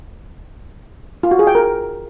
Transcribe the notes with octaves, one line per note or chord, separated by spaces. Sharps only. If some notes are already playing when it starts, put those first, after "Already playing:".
F4
F#4
G#4
G5
A#4